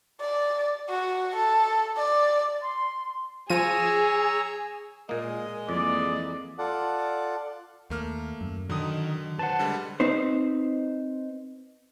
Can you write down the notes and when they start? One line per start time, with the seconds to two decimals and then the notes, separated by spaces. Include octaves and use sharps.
0.21 D5
0.89 F#4
1.36 A4
1.97 D5
2.62 C6
3.50 F3 G#4 C#5 A#5 E6 D#7
5.09 A#2 G#3 A#3 G#4 D#5
5.69 F2 E3 A#3 D5
6.58 F4 A4 D5 F#5
7.90 D#2 A3 A#3 F6
8.41 F#2
8.70 D3 D#3 F#3 D#6
9.39 B4 C5 F#5 A5
9.59 D3 G3 G#3
10.00 C4 D#4 B4 C5